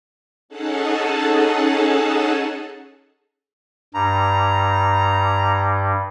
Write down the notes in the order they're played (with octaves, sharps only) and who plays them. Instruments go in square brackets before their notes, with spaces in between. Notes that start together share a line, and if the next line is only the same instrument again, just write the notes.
[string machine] C#4 D#4 G#4 A4 F#5 A5
[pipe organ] G2 [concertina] A#5